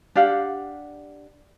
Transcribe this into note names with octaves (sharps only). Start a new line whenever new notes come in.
D4 G4 F5 F#5